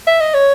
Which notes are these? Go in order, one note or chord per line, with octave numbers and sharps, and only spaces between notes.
E5
D#5
C#5